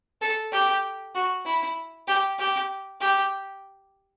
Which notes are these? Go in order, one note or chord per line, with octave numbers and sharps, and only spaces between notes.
A4
G4
F#4
E4
G4
G4
G4